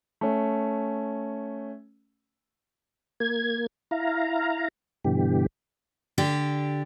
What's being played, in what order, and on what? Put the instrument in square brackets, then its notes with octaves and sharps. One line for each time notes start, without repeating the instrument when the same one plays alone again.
[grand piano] A3 C#4
[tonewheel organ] A#3 G#6
E4 F5 A#5
G2 B2 D3 E3 G4
[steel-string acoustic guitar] D3 D4 G4